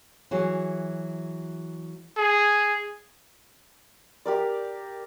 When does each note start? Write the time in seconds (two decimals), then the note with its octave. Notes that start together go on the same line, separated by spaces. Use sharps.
0.31 E3 F#3 G#4
2.17 G#4
4.26 G4 A#4 D5